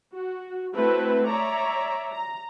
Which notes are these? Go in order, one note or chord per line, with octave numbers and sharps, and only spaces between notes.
F#4
A3 C4 E4 F#4 B4
C#5 D5 E5 A#5
A#5